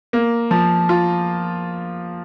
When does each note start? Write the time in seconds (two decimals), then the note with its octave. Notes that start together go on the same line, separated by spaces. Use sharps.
0.13 A#3
0.51 F3
0.89 F4